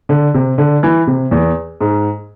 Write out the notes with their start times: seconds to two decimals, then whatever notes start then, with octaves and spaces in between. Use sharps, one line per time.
0.09 D3
0.34 C3
0.58 D3
0.83 E3
1.07 C3
1.31 E2
1.81 G#2